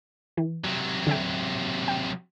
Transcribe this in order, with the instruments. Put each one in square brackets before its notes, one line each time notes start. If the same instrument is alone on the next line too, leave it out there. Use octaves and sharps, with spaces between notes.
[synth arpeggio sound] E3
[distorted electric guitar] C3 F#3
[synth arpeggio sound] D3 E5 G5
G5